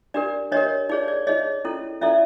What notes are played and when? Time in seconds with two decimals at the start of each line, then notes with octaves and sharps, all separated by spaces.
0.14 D4 G4 A#4 D5
0.52 D4 G4 A#4 C#5 D#5
0.89 D#4 G#4 C#5 D5
1.08 D5
1.27 D#4 G#4 C#5 D#5
1.65 C#4 E4 A4
2.01 C#4 E4 A4 D5 E5